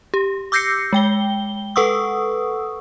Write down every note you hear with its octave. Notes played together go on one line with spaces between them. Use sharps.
G4
D6 E6 G6 A#6 C7 C#7
G#3 G5 G7
A4 B4 F#5 C#6 D#6 E6